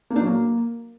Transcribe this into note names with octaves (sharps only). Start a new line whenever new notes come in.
A#3
D4
F#3
A#3